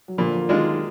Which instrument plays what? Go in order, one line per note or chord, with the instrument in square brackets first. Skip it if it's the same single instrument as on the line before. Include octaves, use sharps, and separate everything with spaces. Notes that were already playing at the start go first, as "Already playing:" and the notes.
[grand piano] F#3
[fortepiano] A#2 [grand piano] D3 F3
[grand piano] D#3 F#3 [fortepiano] G#3 D4 F4